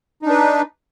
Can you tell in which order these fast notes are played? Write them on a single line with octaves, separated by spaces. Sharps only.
D#4 D4 B4